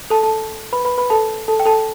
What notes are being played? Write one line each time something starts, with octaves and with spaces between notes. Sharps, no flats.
A4 A5
A4 A5
B4 B5
B4 B5
B4 B5
A4 A5
A4 A5
G5
A4 A5